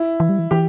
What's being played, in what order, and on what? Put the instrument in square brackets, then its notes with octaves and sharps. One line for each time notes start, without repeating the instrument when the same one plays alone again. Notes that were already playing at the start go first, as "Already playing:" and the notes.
Already playing: [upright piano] E4
[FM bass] E3
G3
E3
[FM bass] E3 [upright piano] G4